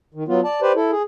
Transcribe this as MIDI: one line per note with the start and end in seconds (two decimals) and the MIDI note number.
0.14 0.24 51
0.28 0.41 54
0.28 0.41 59
0.28 0.41 65
0.44 0.60 74
0.44 0.60 81
0.62 0.72 67
0.62 0.72 71
0.62 0.72 72
0.62 0.72 74
0.76 0.91 64
0.76 0.91 69
0.91 1.02 68